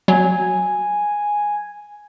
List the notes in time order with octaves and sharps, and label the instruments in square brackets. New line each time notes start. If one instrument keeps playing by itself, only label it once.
[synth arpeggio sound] F#3 [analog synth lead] G#5